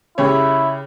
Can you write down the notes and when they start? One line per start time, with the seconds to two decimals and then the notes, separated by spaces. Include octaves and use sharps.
0.18 C#3 E4 G4 C#5